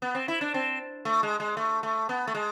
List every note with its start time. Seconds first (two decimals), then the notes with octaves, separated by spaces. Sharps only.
0.02 B3
0.15 C4
0.28 E4
0.41 D4
0.54 C4
1.05 A3
1.23 G#3
1.40 G#3
1.57 A3
1.83 A3
2.09 B3
2.27 A3
2.35 G#3